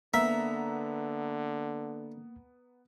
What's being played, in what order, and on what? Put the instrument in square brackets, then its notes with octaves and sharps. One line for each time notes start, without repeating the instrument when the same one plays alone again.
[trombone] D3 [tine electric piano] A#3 [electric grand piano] B3 A#5 [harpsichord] E5